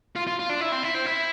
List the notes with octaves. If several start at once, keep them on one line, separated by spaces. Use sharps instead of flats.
F4
F4
F4
D4
E4
C4
E4
C4
E4